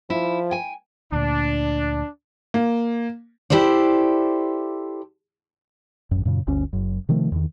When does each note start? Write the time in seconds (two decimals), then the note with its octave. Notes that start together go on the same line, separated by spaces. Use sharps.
0.10 F3 E4
0.51 G5 G#5
1.12 D2 A#2 D4
2.54 A#3
3.50 E4 G4 A4 C5 D5
6.11 A1 F#2
6.25 F#2 A#2 C#3
6.47 G1 D2 C#4
6.73 F#1 F#2
7.09 C3 D#3 F3 A3
7.32 E2 D#3